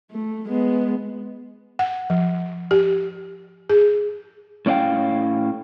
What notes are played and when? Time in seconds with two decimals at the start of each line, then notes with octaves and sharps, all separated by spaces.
0.11 A3
0.48 G#3 B3
1.79 F#5
2.10 F3
2.71 G4
3.70 G#4
4.66 A2 C#4 D5 F5 G5